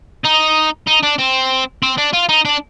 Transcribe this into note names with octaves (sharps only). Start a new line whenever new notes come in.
D#4
D#4
D4
C4
C4
D4
F4
D#4
D4